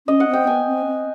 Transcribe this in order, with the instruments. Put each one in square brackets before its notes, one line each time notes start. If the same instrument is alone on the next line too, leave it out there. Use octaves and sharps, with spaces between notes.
[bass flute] C#4 [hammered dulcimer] D#5
[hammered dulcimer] F#5
[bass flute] C4
[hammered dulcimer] G5
[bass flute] B3 [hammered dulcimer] G#5
[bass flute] C4
C4